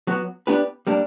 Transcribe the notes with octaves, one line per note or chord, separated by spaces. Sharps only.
F#3 B3 F#4
B3 D4 G4 B4
G3 A#3 D4